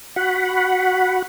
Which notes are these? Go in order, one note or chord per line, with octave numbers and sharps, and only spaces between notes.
F#4 F#5 B5